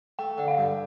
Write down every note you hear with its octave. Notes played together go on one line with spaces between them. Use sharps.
A3 G5
D3
F5
G2